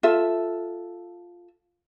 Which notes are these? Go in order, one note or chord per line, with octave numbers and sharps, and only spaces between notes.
F4 A4 E5